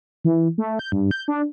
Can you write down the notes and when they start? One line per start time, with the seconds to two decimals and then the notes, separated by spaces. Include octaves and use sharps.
0.25 E3
0.58 A3
0.79 G6
0.92 G2
1.11 G6
1.28 D4